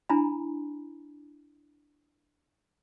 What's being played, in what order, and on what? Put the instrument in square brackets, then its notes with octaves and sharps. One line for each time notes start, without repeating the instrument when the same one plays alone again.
[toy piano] D4 E4 G#5 A#5 B5